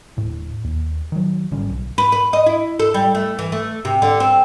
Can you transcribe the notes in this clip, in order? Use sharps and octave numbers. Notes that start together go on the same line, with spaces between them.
D#1 A2
D#2
D#3 F#3
G#1 D3 G3 C#4
B1
B4
B4
D#5
E4
A4
G3
A3
E3
A3
C3
D3
C4